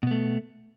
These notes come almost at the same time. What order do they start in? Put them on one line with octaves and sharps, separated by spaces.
B2 B3 A3